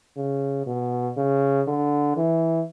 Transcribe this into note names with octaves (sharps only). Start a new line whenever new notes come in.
C#3
B2
C#3
D3
E3